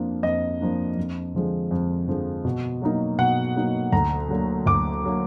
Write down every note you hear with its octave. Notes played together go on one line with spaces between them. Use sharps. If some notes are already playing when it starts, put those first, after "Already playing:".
Already playing: F2 F3 A#3 D4
F2 D#5
F3 A#3 D4
F2
D3 F3 G#3
F2
D3 F3 G#3
B2
F#3 A#3 D#4
B2 F#5
F#3 A#3 D#4
D2 A#5
D3 F#3 A#3
D2 D6
D3 F#3 A#3